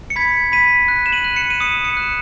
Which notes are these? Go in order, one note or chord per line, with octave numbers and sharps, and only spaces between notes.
C#7
B5 G#6 B6
B5 B6 D#7
F#6
E7
D#7 F#7
F#6
C#7 E7
D#7
D#6 C#7 E7
C#7 E7
F#6